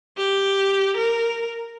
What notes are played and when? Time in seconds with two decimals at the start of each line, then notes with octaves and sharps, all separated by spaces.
0.17 G4
0.97 A#4